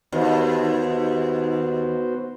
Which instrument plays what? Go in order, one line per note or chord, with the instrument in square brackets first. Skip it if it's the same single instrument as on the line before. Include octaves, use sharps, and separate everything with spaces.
[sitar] D#2 [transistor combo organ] B3 F#4 C5